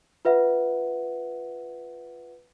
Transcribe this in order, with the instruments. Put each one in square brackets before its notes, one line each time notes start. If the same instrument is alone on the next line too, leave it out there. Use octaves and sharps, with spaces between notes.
[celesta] F4 B4 E5 F#5